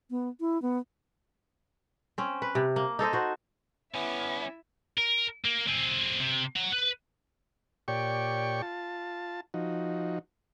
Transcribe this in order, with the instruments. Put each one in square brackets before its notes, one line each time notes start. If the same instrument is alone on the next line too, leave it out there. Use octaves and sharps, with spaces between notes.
[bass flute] B3
E4
B3
[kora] C4 C#4
B4
C3
A#3
D#4 A4 C5 D#5
F#4 C5
[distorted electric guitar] D3 G3 [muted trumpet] B3 [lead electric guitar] C#4 [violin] E4 E5
[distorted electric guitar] A#4
A#3
C4 G#4
C3
F#5 A#5
B4
[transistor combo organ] A#2 G4 C#5 D5 G5 C#6
F4 A5
F3 D#4 F#4